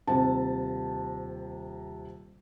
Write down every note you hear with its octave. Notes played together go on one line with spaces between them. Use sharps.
D#1 C3 A5